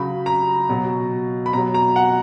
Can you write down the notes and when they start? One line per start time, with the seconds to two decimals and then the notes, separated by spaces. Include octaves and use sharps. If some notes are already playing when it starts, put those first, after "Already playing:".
Already playing: C#3 F#3 B5
0.26 A#5
0.69 B2 F#3
1.46 B5
1.53 B2 F#3 A#5
1.74 A#5
1.96 F#5